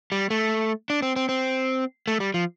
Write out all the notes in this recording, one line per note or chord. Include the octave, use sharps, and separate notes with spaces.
G3
A3
D4
C4
C4
C4
A3
G3
F3